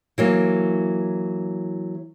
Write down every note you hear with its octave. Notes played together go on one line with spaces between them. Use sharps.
E3 F#3 A#3